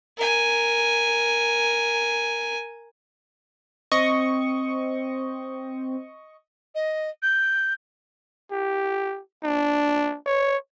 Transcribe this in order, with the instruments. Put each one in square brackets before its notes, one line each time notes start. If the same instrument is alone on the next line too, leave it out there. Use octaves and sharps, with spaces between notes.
[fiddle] A#4 G#5
[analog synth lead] C4 [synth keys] D#5 C#6
[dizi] D#5
G6
[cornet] G4
D4
C#5